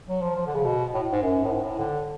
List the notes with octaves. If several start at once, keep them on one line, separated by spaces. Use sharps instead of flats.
F#3
F3
F3
D3
C#3
B2
A2
G#2
F#2
A2
G#2
A2
D3